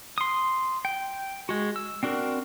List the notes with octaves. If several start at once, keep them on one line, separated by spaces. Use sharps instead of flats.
C6 D#6
G5
G#3 F#4
E6
C4 D4 F#4 A#4